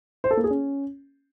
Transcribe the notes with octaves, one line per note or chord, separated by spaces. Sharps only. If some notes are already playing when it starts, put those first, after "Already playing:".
C5
A4
A#3
G#4
C#4